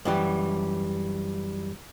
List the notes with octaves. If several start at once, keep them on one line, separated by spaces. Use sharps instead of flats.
F#2 E3 G3